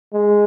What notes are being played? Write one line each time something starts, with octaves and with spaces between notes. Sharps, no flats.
G#3